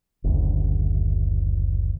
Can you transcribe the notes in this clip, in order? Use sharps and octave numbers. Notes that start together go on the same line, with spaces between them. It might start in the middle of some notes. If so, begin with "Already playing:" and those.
F#1 D2